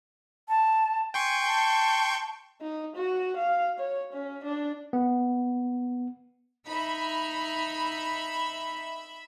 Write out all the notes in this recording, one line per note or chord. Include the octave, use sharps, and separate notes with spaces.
A5
G5 G#5 C6 C#6
A5
D#4
F#4
F5
C#5
C#4
D4
B3
D#4 E5 B5